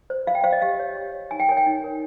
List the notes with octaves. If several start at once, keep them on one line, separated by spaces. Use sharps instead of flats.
C5
F4 F5
G5
C5 F5
D#5
G4 F5
C#5
G4
C#5
D#4 G#5
G5
A#4 C#5 G#5
G5
D#4
A#4 C#5